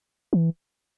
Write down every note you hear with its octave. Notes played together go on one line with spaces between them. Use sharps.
E3